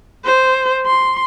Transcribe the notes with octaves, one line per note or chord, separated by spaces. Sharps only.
C5
C6